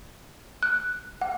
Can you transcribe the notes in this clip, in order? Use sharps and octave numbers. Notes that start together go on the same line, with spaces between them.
F#6
F#5